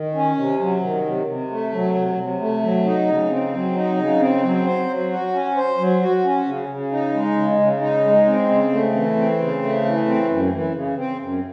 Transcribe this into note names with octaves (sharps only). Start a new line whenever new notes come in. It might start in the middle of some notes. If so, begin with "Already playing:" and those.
Already playing: D#3
C#4
C3
F#3
D#3
C3
C3
A3
F#3
C3
C3
A3
F#3
D#4
C#3
C4
F#3
D#4
C#3
C4
F#3
C5
F#3
F#4
C#4
C5
F#3
F#4
C#4
C#3
C#3
D#4
G#3
C#3
C#3
D#4
G#3
C4
C#3
A3
E3
C4
C#3
A3
E3
C4
F#2
E3
C#3
C4
F#2